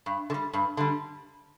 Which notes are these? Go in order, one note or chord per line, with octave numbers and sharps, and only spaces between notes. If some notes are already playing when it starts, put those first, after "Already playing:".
G2
D3
G3
G2
D3 G3